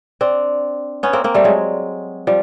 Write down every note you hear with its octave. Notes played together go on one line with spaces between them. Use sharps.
C4 D4
B3 C#4
A#3 C4
A#3 C4
G3 A3
F#3 G#3
F3 G3